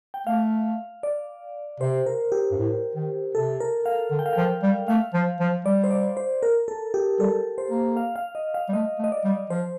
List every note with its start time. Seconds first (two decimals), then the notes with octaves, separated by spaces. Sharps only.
0.14 G5
0.27 A3 F5
1.03 D5
1.80 C3 C5
2.06 A#4
2.32 G4
2.51 G2
2.57 A2
2.95 D#3
3.35 C3 A4
3.60 A#4
3.86 F5
4.11 D3
4.19 G5
4.26 F5
4.33 F3 G5
4.63 G3
4.88 A3 F5
5.14 F3
5.40 F3
5.65 G3 D5
5.84 C5
5.91 D5
6.17 C5
6.43 A#4
6.68 A4
6.94 G4
7.20 G3 A4
7.58 C5
7.70 A#3
7.97 F5
8.16 F5
8.35 D#5
8.54 F5
8.69 G3
8.73 A3 D#5
8.99 A3
9.04 D#5
9.12 D5
9.24 G3
9.50 F3 C5